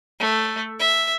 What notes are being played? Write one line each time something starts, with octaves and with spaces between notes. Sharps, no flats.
A3
E5